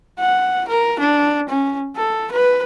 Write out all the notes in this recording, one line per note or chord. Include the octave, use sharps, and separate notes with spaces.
F#5
A#4
D4
C#4
A4
B4